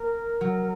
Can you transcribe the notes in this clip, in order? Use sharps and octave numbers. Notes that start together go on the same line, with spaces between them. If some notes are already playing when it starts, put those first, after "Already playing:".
Already playing: A#3 A#4
F#3